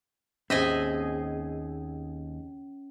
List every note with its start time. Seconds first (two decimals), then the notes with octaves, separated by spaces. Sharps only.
0.50 D#2 C4 C#4 G#4 D#5 E5